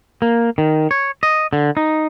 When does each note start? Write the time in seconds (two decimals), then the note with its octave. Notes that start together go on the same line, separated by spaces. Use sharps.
0.22 A#3
0.58 D#3
0.91 C#5
1.23 D#5
1.53 D3
1.77 D#4